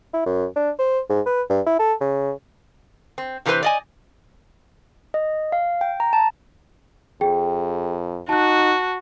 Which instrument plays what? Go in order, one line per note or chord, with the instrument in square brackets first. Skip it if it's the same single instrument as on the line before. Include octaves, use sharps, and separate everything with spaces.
[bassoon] E4
F#2
D4
C5
G#2
B4
G2
E4
A4
C#3
[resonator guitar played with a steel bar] C4
C3 E3 G#3 C4 B4 C5
D5 D#5 G#5
[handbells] D#5
F5
G5
A#5
A5
[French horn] F2 [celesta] G#4 G5
[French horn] D#4 [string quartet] F#4 [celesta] A5 F#6